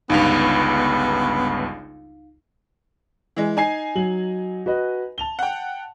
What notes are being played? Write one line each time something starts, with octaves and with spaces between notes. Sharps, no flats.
G1 C#2 G2 B3 D#4 F5 F7
E3 G#3
D#4 G#5 C7
F#3 F#7
F#4 B4 D#5
A5 F7 G7
F#5 G5